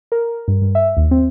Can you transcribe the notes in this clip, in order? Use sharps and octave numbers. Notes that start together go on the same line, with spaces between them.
A#4
G2
G2
E5
D#2
C4